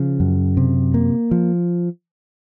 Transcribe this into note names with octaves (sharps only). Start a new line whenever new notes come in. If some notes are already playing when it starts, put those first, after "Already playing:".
Already playing: C#3 F3
F#2
C3
A#3
F3